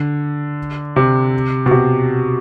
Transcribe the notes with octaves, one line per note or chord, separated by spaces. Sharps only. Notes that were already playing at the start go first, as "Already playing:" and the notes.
Already playing: D3
C3
B2
C3